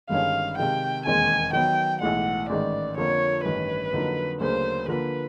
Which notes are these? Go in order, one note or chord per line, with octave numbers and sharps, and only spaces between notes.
G1 G2 D#3 G#3 C#4 F5
C3 D#3 G#3 G5
E1 D#2 D#3 G#3 C4 G#5
D#3 F#3 B3 G5
B1 A2 E3 G#3 F#5
A1 G#2 D#3 D5
F2 D3 F3 A#3 C#5
A1 G2 D#3 B4
F2 D3 F#3 A#3 D#4
D2 C#3 F#3 A#3 D4 C5
D3 F3 A#3 B4